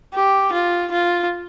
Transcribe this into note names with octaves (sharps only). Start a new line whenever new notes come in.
G4
F4
F4